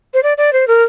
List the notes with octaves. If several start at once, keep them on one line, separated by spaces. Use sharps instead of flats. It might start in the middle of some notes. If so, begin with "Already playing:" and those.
C5
D5
D5
C5
A#4